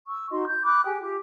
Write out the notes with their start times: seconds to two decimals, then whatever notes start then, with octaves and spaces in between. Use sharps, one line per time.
0.06 C#6 E6
0.30 D#4 F#4 D#5 C6
0.47 G6
0.64 B5 D6 D#6 F#6
0.85 G4 G#4 G5 G#5
1.01 F4 G4